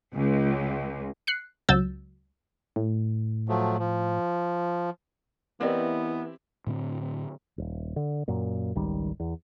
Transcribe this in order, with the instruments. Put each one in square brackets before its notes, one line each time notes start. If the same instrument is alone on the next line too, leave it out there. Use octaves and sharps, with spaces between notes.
[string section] C#2
[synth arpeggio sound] F#6 C7 C#7
C#2 F#3 E6 G6 A6
[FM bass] A2
[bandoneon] F3 F#3 A3
F3
[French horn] E3 [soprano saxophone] B3 [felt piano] C4 E4 G4 [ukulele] A#4 D5 D#5
[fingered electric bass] A2 D3 C4
D#1
D3
F#2 A#2
G#1 C#2 D#3 G3
E2